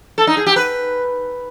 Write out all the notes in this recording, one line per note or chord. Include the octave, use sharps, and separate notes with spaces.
A4
D#4
G#4
G4
B4